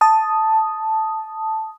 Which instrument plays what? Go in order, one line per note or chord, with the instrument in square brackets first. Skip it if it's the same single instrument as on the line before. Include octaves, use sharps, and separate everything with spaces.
[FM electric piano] A5 D#6